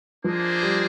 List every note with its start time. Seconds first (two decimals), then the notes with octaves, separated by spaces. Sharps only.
0.24 F3 A#3 D4 G#4 C5 D#5
0.63 G3